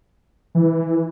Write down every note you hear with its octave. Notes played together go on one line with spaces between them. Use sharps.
E3